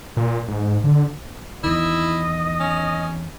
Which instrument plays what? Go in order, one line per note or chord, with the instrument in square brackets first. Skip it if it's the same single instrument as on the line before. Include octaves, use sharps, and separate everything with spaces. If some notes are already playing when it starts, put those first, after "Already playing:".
[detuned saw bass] A#2
G#2
D3
[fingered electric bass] E2 D#3 [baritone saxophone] E4 [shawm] D#5
[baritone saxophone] C#4